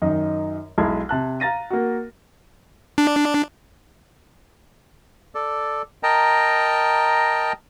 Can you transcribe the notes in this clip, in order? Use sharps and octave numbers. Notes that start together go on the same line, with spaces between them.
F#2 D#3 D#4 D#5
B1 G#3 E4 A5 G#6
C3 A5 F#6
F5 A#5 A6 A#6 D#7
A#3 F#4
D4
A4 D5
A#4 D#5 G5 A5 A#5